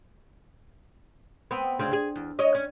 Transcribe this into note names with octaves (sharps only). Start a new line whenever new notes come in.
B3 C4
D2 C#3 C4
G#4
E2
C#5 D#5
C#4